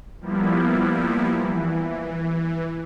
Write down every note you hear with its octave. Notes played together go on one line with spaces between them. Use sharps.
F3 G3 A#3 B3 E4
E3